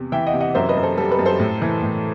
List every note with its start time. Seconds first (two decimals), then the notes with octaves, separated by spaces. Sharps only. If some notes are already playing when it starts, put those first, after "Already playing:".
Already playing: E2 C3
0.12 E3 E5 G5
0.27 D#5 F#5
0.34 C3
0.40 D#5 F#5
0.55 F#2 C5 E5
0.69 B4 D#5
0.76 F#2
0.83 A4 C5
0.97 G3 A4
1.12 B4
1.19 F#2
1.25 A4 C5
1.39 A2
1.62 E3
1.82 A2